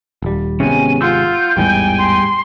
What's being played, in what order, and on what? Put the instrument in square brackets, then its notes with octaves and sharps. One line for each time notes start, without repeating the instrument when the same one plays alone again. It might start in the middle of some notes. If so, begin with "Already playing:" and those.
[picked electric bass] D#1 G3
[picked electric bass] G#1 C3 G#3 [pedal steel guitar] B3 C#4 [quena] G#5
[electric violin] F4 [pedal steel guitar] F#5 C6 E6 [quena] G6
[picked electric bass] A1 E2 G#2 [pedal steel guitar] G3 [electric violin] G5 G#5
[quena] C6